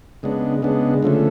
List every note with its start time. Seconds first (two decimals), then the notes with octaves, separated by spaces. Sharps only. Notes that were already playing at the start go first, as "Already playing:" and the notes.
0.23 C#3 G#3 B3 D4
0.62 C#3 G#3 B3 D4
1.03 D3 F3 A3 C#4